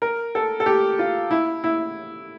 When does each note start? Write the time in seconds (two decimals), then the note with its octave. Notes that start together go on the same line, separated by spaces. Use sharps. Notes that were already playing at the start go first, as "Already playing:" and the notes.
0.02 A#4
0.35 A4
0.60 A4
0.66 G4
0.99 F4
1.31 E4
1.64 E4